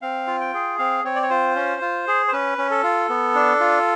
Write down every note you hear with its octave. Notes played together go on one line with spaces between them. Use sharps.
C4 F5
F4
G5
G#4
C4 F5
C4 C#5
D5
C#5
F4 C5
C#4
F4
G#4
C5
C#4 B4
C#4
A4
F4
B3
D4
F4